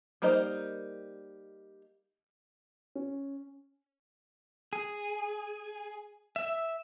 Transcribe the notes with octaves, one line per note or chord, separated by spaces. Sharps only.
G3 A#3 D#4 C5 D#5
C#4
G#4
E5